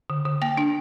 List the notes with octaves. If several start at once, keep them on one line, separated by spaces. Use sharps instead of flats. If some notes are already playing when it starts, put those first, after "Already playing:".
D3
D3
A#3 G5
D4